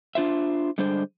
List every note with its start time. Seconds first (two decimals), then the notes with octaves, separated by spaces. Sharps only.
0.15 D4 F4 C5 E5
0.78 D3 G3 G#3 D4 C5